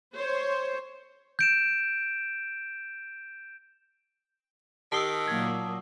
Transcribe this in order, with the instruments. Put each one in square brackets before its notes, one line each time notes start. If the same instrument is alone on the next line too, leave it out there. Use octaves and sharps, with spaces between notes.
[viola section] C5 C#5
[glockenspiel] G6 D7 E7
[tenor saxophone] D#3 [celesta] G4 C7 G7 [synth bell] A5 D#6 E6
[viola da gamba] A#2 F#3 A#3 [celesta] G#6